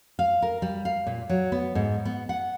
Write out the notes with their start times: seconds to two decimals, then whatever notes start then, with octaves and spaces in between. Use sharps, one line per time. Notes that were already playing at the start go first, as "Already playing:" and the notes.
0.19 F5
0.42 A#4
0.62 G3
0.85 F5
1.07 A#2
1.29 F#3
1.52 B3
1.75 G#2
2.05 B3
2.29 F#5